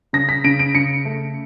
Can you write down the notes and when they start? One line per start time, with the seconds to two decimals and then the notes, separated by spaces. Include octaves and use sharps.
0.13 C#3 A#6
0.29 B6
0.44 C#3 D7
0.59 D7
0.75 C#3 C#7
1.05 A3